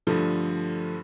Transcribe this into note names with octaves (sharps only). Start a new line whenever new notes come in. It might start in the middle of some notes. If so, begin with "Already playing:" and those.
G2 D3 F3 A3